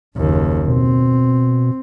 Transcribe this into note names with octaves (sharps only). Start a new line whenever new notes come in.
F#1 D#2
B2 C4